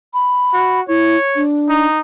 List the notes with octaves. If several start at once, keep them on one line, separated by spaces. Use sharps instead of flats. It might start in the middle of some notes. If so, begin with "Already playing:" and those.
B5
F#4
E4 C#5
D4
D#4